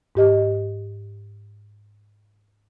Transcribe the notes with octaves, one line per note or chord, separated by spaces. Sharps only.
G#2 G4 D#5